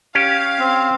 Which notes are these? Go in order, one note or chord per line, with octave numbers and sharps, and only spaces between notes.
C#4 G4 F5
C4